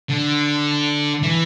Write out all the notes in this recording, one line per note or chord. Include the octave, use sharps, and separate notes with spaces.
D3
E3